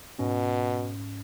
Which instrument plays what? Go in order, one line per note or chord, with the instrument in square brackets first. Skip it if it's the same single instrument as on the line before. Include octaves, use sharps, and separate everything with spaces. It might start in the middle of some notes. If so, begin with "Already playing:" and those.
[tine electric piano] G#2 C#4 [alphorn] B2